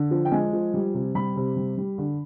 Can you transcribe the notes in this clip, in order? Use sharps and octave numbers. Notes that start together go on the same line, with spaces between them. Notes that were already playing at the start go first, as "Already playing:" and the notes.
Already playing: D3
F3
G5
G#3 G#5
F3
G3
C3
G3 B5
C3
G3
G3
D3